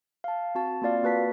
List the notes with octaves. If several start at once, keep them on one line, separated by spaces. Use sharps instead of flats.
F5 A5
C4 F#4 A5
A#3 C4 F4 D5 F5
A#3 F#4 B4 A5 B6